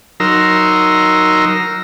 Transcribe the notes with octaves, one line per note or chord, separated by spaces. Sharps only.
F#3 D#4 A#4 A#5 C6 E6